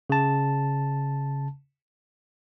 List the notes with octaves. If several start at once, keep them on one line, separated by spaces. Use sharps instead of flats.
C#3 A5